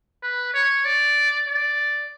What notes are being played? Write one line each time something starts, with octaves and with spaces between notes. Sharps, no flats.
B4
C#5
D5
D5